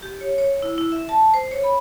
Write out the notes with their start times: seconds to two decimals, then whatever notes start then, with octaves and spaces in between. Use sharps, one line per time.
0.02 G4
0.21 C#5
0.38 C#5
0.62 E4
0.78 E4
0.92 E5
1.09 A5
1.34 C5
1.51 C#5
1.63 B5